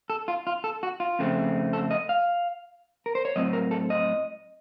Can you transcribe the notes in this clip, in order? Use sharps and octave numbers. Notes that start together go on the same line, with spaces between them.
A4
F4
F4
A4
F#4
F4
F2 C#3 A3 C4
A4
D#5
F5
A#4
C5
C#5
A2 F#3 C4 D#5
A#4
A4
D#5